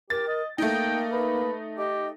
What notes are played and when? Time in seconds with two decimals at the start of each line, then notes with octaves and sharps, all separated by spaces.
0.10 G4 A#4 A6
0.27 D#5
0.58 A3 A#3 D#4 G5
1.12 B4
1.78 G4 D#5